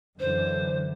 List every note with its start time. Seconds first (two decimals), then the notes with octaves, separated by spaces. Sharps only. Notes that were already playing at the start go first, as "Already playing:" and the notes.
0.20 F#2 D3 E3 C5